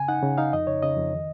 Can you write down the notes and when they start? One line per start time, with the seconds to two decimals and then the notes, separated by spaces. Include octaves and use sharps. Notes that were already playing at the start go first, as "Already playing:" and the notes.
Already playing: C#3 G#5
0.08 D#4 F#5
0.22 C#3
0.38 D#4 F5
0.53 F2 D#5
0.67 C#3 C#5
0.82 C#3 D#5
0.97 F2
1.12 D#3